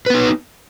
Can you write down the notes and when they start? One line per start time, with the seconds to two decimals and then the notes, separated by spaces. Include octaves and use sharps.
0.06 B4
0.10 B3
0.14 D#4